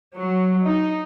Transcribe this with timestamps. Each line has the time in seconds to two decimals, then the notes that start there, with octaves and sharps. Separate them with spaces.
0.16 F#3
0.65 D#4